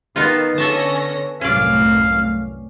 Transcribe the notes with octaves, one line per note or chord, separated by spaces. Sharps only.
D#3 B3 D#4 F4
D3 C#4 A4 E5 A5 A#6
C2 F#2 A2 C#4 D5 F5